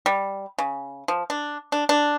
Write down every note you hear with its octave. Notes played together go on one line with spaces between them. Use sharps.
G3
C#3
F3
D4
D4
D4